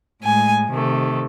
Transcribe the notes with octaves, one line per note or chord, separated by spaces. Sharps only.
A2 G#3 G#5
C3 D#3 A3